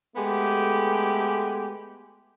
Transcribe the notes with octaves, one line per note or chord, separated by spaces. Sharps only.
G#3 A3 B3 G4